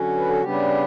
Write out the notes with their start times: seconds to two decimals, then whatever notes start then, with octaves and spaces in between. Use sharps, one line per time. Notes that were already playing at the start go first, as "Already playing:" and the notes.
Already playing: D3 F#3 C#4 F#4
0.18 B4
0.30 A4
0.42 C#3 G3 B3 D4 G4